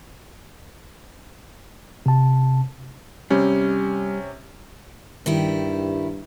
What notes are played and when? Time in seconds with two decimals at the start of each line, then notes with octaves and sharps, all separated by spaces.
2.06 C3 A5
3.30 C3 G3 C#4
5.26 G2 D#3 G3 E4